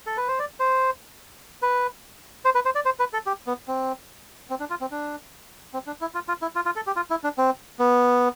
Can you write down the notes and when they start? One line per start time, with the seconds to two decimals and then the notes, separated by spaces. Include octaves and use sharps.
0.06 A4
0.17 B4
0.28 C5
0.39 D5
0.60 C5
1.62 B4
2.45 C5
2.55 B4
2.65 C5
2.75 D5
2.85 C5
2.99 B4
3.13 A4
3.26 G4
3.47 B3
3.68 C4
4.50 C4
4.60 D4
4.70 F4
4.81 C4
4.91 D4
5.73 C4
5.87 D4
6.01 E4
6.14 F4
6.28 F4
6.42 E4
6.56 F4
6.66 F4
6.76 A4
6.87 G4
6.96 F4
7.10 E4
7.24 D4
7.38 C4
7.79 B3